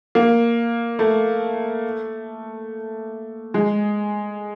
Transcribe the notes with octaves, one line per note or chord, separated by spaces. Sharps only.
A#3
A3
G#3